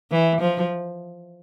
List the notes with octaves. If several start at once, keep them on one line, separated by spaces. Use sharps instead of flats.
E3
F3